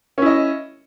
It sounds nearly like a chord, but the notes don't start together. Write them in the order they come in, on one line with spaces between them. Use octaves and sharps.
C#4 E4 D#5